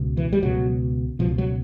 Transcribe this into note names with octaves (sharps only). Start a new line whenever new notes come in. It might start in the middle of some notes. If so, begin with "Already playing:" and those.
Already playing: C#2 B2
E3
G3
C#2 B2 F#3
C#2 B2 F3
F#3